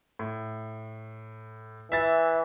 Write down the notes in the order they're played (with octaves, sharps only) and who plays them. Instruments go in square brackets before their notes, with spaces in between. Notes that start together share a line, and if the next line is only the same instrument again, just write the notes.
[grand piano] A2
[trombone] E3 [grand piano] E5 A6